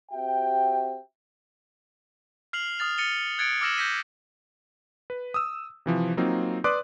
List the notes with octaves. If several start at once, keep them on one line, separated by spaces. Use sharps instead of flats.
C4 F#4 G4 E5 G5
F6 C7 F7 F#7
D#6 F6 A6 F7
A6 C#7 D#7 F7 G7
F#6 G#6 A6 C#7 D7
D6 E6 F6 A#6 E7 F#7
G6 A#6 B6 D#7
B4
D#6 E6
C3 E3 F3
F#3 A#3 C4 D#4 F4
B4 D5 C6 D6 D#6 F#6